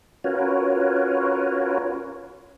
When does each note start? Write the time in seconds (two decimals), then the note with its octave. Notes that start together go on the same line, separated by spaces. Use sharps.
0.24 C#4 F4 F#4 A#4 B4 C#5